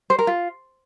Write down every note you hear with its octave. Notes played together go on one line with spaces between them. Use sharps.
C5
A#4
F4